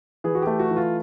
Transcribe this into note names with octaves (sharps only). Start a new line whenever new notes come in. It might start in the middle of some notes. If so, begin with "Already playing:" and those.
E3 G#4
F#4
A3 G4
F#4
E3
F4